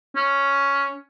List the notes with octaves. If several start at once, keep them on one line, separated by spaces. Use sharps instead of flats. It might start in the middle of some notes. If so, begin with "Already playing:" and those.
C#4